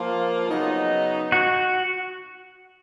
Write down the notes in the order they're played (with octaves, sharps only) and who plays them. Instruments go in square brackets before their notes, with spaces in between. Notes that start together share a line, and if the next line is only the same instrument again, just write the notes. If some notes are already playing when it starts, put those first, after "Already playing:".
Already playing: [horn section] F3 A#3 F4
C#3 F#3 B3 D#4
[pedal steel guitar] F#4